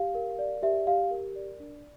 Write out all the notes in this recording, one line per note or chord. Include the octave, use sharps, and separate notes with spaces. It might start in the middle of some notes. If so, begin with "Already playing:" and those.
Already playing: G4 F5
A#4
D5
G4 E5
G4 F5
A#4
D5
D4